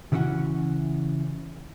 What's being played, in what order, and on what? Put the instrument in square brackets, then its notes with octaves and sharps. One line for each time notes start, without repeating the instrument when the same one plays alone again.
[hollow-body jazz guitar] C#3 E3 G3 C#4 F#4 F#5